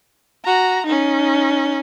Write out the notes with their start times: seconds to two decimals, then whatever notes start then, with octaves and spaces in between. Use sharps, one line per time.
0.45 F#4 A#5
0.86 C#4 D#4